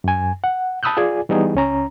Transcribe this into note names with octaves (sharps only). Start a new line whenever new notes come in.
F#2 G#5
F#5
A5 B5 D#6 E6 F#6 G6
F4 G#4 D5 G#5
E3 G3 B3 D#4 G#4
C#2 C#4 A#5